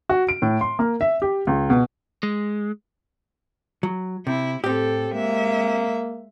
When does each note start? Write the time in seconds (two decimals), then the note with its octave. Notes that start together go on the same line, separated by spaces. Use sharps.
0.09 F#4
0.29 D7
0.42 A2
0.61 C6
0.79 A#3
1.01 E5
1.22 G4
1.47 C#2
1.70 B2
2.23 G#3
3.83 F#3
4.27 C3 E4
4.64 A2 C4 G4 A4
5.14 G#3 A#3 E5